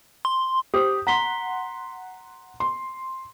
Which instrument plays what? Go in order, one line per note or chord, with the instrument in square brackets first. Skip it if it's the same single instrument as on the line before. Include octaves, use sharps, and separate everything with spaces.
[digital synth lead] C6
[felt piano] G4 C5 [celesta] D#6
[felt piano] F#5 C6 [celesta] A#5 B6 G7
[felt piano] C6